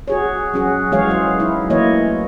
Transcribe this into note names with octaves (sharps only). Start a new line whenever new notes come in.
F#4 G#4 C#5
F#3 C#4 F#4 G#4
E3 G#3 F#4 G#4 C#5 F5
F#3 C5
F#3 D#4 E4
E3 A3 A#3 E4 C#5 D#5